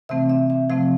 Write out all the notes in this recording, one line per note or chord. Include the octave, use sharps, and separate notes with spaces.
C3 E3 A3 C4 E5
E5
E5
C3 F3 A3 C4 F5